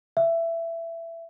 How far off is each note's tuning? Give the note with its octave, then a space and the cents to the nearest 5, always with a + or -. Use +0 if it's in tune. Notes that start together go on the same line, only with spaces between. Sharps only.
E5 +15